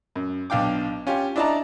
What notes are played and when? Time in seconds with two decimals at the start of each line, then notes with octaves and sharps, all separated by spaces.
0.16 F#2
0.50 B1 D4 F5 G5 D6
1.07 C#4 F4 G4
1.36 D4 E4 D5 D#5 A5 A#5